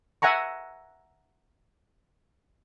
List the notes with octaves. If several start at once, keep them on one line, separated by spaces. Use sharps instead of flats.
E5 F#5 G#5 A#5 C#6